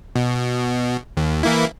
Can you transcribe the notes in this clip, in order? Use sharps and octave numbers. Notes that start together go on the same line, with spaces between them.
B2
D#2
E3 A#3 E4